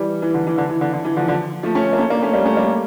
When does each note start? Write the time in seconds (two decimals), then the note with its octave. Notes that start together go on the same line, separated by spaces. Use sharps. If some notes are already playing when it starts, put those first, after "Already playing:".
Already playing: E3 G3
0.22 E3
0.34 D3
0.47 E3
0.58 D3
0.69 E3
0.81 D3
0.93 D3
1.05 E3
1.16 D3 F3
1.28 D3 F3
1.63 F3 A3
1.75 A3 C#4
1.93 A#3
1.98 A3 C#4
2.10 A#3 D4
2.22 A3 C#4
2.33 G3 A#3
2.45 A3 C#4
2.57 G3 A#3